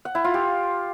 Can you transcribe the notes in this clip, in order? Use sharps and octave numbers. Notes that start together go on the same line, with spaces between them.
F#5
E4
F4
G4